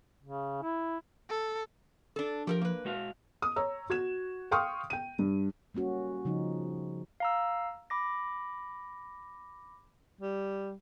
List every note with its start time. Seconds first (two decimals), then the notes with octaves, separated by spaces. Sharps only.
0.23 C#3
0.63 E4
1.29 A4
2.16 D4 A4
2.47 F3 G4 A4 A#4
2.61 A#3 B4
2.85 G#3 F#4 F5
3.42 D#6
3.56 C#5 A#5 E6
3.90 F#4 G#6 E7
4.51 F5 G5 C6 C#6 D#6 F6
4.90 G5 D#7
5.19 G2
5.74 G3 A#3 C#4 F#4
6.25 C#3 F3 D#4
7.20 F5 A#5 E6
7.90 B5 D6 A#6
10.21 G3